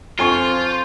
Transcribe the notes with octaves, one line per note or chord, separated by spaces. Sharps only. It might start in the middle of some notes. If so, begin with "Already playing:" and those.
F2 F4 C5 G#5 C#6